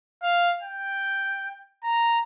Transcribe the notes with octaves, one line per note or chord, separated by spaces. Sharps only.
F5
G5
A#5